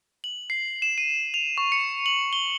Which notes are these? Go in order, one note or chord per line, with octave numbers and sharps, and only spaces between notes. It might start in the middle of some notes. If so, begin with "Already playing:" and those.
F#7
C7
E7
D#7
F7
C#6
C#7
F#7
G7